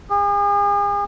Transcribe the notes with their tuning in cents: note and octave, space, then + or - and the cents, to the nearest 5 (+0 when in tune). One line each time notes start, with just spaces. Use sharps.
G#4 -40